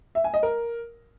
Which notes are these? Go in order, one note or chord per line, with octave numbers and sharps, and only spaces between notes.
E5
G#5
D#5
A#4